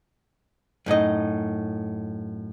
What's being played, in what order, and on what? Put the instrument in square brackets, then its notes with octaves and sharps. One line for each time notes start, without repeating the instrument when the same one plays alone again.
[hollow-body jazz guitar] F#2 A2 D#4 D#5